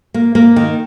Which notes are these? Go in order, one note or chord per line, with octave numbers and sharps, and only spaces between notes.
A#3
A#3
D#3